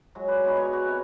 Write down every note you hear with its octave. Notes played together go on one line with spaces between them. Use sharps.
F#3 G#3
B4 D5
G#3 B3 D#4 F#4
C#5
F#4 G#5
C3